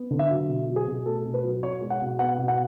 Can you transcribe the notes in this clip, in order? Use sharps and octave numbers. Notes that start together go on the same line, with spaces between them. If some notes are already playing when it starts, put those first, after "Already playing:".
Already playing: B3
D3
E5
F#3
B2
F#3
G#4
B2
A3 A4
B2
B4
F#3
B2 C#5
G#3
F#5
B2
B3 F#5
B2
F#5